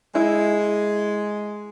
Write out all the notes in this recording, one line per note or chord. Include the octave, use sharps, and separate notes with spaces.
G#3 E4